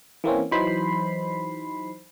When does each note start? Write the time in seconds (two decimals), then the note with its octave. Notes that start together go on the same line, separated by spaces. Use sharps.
0.24 E3 A#3 C4 C#4
0.51 E3 F#3 D#4 C5 B5 C7